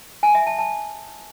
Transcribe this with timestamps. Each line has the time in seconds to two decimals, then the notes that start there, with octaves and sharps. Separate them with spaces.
0.23 G#5
0.35 E5
0.47 A5
0.58 A5